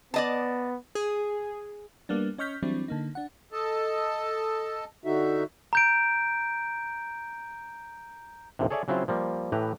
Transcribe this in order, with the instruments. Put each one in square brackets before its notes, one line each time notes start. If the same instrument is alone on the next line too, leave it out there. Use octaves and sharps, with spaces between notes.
[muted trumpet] B3 [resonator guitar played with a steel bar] D5 D#5 A5
[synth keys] G#4
[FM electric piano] G3 A#3 B3 D4
C#4 D#5 C#6 F6 G6 B6
E3 F#3 G3 C4 D4 E4
D3 A#3 D#4
D4 F#5
[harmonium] A4 D#5 A5
D3 D#4 F#4 E5
[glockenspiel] A#5 G6 D7
[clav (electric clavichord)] A#1 D#2 A2 C3
G#4 A4 C#5 D5 E5 G#5
C#3 F#3 C4 E4 F4 C5
F3 G3 A#3
A2 E3 G4 B4 A#5